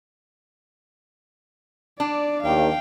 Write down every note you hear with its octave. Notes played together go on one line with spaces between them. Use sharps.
D4 D5
D#2 F5 G5